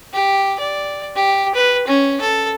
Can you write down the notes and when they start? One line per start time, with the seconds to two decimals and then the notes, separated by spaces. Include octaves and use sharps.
0.13 G4
0.59 D5
1.15 G4
1.55 B4
1.87 C#4
2.21 A4